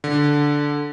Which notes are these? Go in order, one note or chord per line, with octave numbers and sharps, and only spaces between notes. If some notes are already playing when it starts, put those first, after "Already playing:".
D3